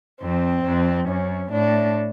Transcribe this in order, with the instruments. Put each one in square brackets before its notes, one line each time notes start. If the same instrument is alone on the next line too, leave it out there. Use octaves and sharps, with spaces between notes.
[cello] F2 [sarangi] C4
[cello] F2
[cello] F#2 [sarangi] C#4
[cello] A2 [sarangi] D4